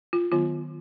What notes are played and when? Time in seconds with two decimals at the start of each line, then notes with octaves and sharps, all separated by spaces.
0.13 F4
0.32 D#3 F#3 B3 F4